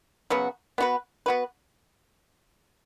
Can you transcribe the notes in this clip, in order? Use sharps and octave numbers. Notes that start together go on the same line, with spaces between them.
C#3 F#3 B3 F#4
B3 F#4 B4
B3 F#4 B4